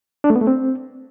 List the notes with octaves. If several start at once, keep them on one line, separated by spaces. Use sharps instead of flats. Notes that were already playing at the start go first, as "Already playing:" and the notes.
D4
A3
B3
A3
C4